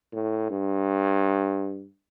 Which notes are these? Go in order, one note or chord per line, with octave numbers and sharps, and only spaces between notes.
A2
G2